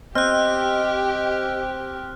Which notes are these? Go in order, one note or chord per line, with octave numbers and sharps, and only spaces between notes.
C4 G4 D#5 F6 F#6